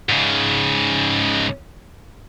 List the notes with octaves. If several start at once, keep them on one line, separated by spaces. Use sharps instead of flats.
G#2 C#3